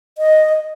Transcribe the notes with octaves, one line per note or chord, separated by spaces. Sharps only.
D#5